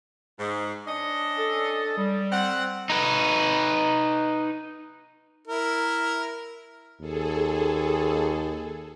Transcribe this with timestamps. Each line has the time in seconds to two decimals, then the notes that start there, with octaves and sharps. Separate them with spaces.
0.39 G#2
0.88 C#4 D4 D#5
1.38 A4
1.98 G3
2.32 C4 F#5
2.90 D#4 B4
5.48 E4 A#4
7.00 D#2 G#4 A4